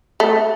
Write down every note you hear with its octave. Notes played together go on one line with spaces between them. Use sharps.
A3